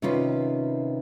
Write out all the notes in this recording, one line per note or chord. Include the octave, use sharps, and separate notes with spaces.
C3 D#3 C#4 F4 B4